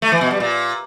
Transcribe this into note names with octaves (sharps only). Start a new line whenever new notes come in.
A3
E3
B2
G3
A#2